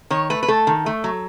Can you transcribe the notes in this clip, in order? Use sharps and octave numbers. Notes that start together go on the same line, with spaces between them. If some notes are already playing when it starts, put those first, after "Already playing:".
D#3 C#5
A3 B4
B4
A3 A4
D#3
A3
F#3